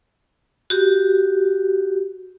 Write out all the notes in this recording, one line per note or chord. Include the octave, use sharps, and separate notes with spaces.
F#4 G4